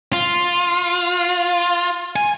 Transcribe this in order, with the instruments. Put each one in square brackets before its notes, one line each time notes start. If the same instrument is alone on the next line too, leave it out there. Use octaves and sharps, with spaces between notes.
[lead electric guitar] F4
G#5